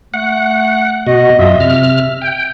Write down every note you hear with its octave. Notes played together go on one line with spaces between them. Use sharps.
A3 F#5
B2 F#4 D#5
F#2 F4 D#5 E5
C3 F6
G5